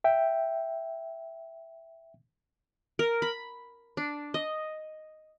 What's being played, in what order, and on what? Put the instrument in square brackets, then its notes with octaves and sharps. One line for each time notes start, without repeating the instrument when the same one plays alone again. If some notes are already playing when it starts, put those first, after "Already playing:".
[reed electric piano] E5 G5
[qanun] A#4
B5
D4
D#5